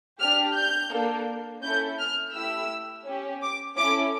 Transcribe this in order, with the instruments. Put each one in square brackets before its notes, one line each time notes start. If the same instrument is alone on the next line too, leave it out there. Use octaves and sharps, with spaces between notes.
[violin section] D4 G4 F6
G6
A#3 D4 A4
C#4 E4 A4 G6
F6
A3 E4 G4 E6
C#4 G4
D6
C#4 E4 A4 D6